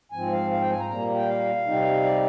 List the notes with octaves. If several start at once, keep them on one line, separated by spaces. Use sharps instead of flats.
G#2 F3 C4 G#5
F5
F5
G5
G#5
A#5
A#2 G3 A#3 A#5
G5
F5
C3 G3 C4 D#4
D5